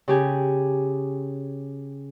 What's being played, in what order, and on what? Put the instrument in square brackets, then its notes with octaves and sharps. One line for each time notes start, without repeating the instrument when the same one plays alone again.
[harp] C#3 G4 G#5